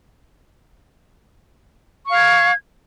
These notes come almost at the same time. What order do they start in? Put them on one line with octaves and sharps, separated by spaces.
C#6 F5 G#6